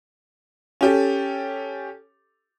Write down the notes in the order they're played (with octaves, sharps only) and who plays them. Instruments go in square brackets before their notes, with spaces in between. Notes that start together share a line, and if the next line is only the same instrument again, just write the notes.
[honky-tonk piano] C#4 G4 A4